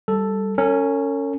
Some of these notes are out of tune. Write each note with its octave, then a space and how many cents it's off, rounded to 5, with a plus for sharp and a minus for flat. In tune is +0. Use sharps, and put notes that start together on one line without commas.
G3 +0 A4 +0
C#4 +0 A#4 -45